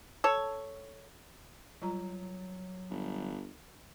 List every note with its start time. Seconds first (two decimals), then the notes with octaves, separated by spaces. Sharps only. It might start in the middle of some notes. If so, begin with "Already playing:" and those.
0.24 A4 C#5
1.82 F#3 G3 F4 A#5
2.90 G1